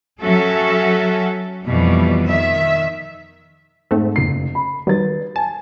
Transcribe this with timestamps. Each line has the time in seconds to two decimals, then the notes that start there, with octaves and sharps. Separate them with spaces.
0.22 F#3 C#4 F#4 A4 E5
1.66 F2 B2 E3 G3
2.28 D#3 E5
3.91 G#2 A3 C4
4.16 F#1 C7
4.55 B5
4.87 D#3 F#3 G3 B4 A6
5.36 G#5 A5